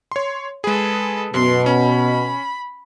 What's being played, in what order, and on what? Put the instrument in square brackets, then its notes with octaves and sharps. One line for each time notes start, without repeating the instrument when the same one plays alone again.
[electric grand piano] C#5 C6
[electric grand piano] G#3 G#4 [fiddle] A4 B4
[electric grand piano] F#2 [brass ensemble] B2 [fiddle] C6
[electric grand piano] C#4 [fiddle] B5